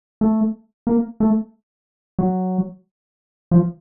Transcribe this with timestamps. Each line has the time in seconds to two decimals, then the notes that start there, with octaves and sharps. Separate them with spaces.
0.21 A3
0.87 A#3
1.20 A3
2.19 F#3
3.51 F3